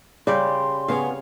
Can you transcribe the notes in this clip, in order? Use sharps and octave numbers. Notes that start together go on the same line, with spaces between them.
C#3 G3 G4 D5 C6
C#3 B3 C#5 F5